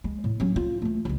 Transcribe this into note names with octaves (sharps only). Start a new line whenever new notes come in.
G#3
A2
F#3 C#4
F4
E3 A3
C#2 G#3